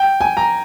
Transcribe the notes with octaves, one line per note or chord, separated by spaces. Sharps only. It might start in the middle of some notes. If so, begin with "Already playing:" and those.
Already playing: G5
G#5
A#5